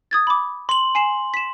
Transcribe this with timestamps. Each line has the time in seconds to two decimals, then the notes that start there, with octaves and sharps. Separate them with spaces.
0.11 D#6 G#6 A6
0.27 B5 D6
0.69 C6 F#7
0.95 G#5 C7 E7
1.34 B6 E7